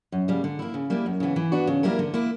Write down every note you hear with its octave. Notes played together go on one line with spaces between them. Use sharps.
F#2
C#3 G3 A#3
D3
A#3 E4
C#3
G3 A#3 E4
F#2
C#3 E3 B3
E3
B3 D4 F#4
C#3
G3 A#3 E4 A#4
D3
A#3 E4